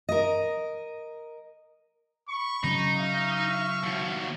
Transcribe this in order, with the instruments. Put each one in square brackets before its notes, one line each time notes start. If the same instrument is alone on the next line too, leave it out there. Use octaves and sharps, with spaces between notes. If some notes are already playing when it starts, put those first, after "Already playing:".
[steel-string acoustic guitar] A#4 D#5
[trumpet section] B5 C#6
[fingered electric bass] C#3 F#3 C#4 [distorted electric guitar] D#4
[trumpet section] E5 F5 C#6
[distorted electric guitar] D#2 B2